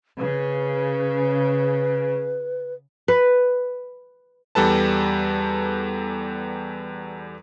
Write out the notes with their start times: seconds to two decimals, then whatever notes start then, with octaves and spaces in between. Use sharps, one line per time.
0.20 C#3 B4
3.08 B4
4.55 E2 G3 A4 B4 A5